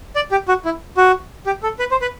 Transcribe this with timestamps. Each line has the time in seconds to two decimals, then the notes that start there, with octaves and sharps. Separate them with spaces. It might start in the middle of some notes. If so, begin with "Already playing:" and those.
0.16 D5
0.31 G4
0.48 F#4
0.65 E4
0.97 F#4
1.46 G4
1.63 A4
1.79 B4
1.91 C5
2.02 B4